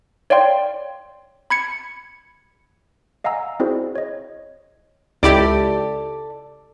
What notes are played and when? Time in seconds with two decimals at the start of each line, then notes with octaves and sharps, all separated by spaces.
0.30 C#5 D5 F5 G5 C6
1.50 B5 G#6 C#7
3.24 D#5 F5 F#5 G#5 A#5 E6
3.60 C4 E4 F#4 G#4 C5 D5
3.95 C#5 D#5
5.23 C#2 E4 G4 A4 D5